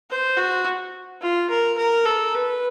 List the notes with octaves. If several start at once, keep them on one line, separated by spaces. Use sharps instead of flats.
C5
F#4
F4
A#4
A#4
A4
B4